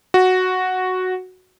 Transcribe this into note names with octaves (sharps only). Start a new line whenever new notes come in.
F#4